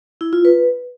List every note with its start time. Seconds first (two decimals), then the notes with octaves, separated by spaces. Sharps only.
0.21 E4
0.33 F4
0.45 B4